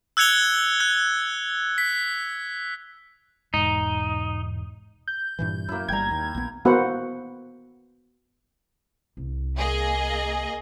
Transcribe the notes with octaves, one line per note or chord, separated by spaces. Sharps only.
E6 F#6 G#6 C#7 F7 G7
F#6
B6
E1 G#2 D#4
G6
G2 A#2 E3
F#2 A#3 E4
G1 G3 G5 A#5 G#6
D#2
A#1 B3
A#3 B3 F#4 B4 C5 F#5
C2
A#3 G#4 D#5